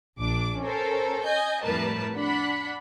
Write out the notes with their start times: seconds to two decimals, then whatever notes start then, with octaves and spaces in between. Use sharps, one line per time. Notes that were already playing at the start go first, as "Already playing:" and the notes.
0.16 A#1 D4 D6
0.60 C#4 A4 A#4 C5
1.24 D#5 G#5 G6
1.63 F2 A2 G3 A#4 B4 A5
2.14 D4 F#5 B5